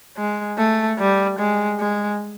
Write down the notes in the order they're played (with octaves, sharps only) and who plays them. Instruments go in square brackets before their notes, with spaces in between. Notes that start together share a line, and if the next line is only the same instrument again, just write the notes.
[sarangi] G#3
A3
G3
G#3
G#3